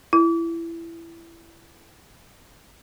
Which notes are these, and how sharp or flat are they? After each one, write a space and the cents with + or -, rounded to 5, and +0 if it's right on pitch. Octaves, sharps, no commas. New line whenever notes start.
E4 +20